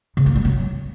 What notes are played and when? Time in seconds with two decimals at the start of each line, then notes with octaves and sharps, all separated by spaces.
0.17 C#3
0.26 A#3
0.35 G3
0.45 F#3